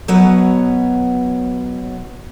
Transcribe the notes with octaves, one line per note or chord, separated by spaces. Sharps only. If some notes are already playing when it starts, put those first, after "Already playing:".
B2 F#3 B3 B4 C#5 F#5